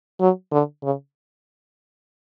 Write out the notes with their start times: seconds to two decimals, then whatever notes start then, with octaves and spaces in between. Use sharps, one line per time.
0.20 F#3
0.52 D3
0.83 C#3